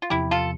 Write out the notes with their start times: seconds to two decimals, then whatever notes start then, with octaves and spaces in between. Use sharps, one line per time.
0.02 F4
0.10 E2 C3 F3 E4 G4
0.31 F4 A4